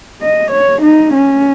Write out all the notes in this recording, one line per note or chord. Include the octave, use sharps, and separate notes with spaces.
D#5
C#5
D#4
C#4